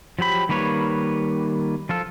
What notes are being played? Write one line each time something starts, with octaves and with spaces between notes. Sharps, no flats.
F3 F#3 G4 B5
D#3 G3 A#3 B4 C#5
F3 F4 A4